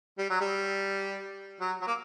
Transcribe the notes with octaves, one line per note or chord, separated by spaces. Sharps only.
G3
F#3
G3
F#3
F#3
A#3